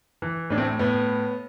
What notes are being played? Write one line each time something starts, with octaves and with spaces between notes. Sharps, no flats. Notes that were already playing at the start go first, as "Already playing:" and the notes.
E3
A2 D4
A3 C4
A2 B3